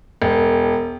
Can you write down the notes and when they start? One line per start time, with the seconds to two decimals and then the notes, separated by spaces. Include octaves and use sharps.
0.22 E1